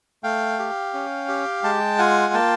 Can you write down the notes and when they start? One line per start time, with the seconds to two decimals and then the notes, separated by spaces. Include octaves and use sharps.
0.24 A3 F5 G5
0.59 G4
0.94 C#4
1.28 G4
1.63 G#3 G5 A5
1.99 F4 F#5 G#5
2.34 A#3 G5 A5